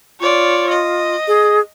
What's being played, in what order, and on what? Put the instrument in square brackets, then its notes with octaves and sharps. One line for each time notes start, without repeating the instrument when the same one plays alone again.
[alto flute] F4 [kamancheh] C#5 D5
[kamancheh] D#5
[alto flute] G#4